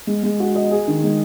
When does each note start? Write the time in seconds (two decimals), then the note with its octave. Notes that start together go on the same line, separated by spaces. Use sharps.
0.07 G#3
0.23 G#3
0.40 F#4
0.55 D#5
0.71 G#4
0.88 D#3
1.04 G#3